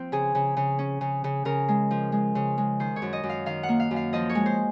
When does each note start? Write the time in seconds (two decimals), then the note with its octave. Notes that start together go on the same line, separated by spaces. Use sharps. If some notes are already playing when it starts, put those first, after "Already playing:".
Already playing: F3 C4
0.12 C#3 G#4
0.35 C#3
0.57 C#3
0.79 C#4
1.01 C#3
1.24 C#3
1.45 C#3 A#4
1.68 G#3
1.91 F3
2.12 G#3
2.35 C#3
2.58 G#3
2.80 D#3 C5
2.96 C#5
3.02 F#2
3.13 D#5
3.23 F#2
3.29 F5
3.46 D#3 F5
3.63 F#5
3.69 A#3
3.80 F5
3.91 F#2
3.96 F5
4.13 F3 D#5
4.29 C#5
4.35 G#3
4.46 C5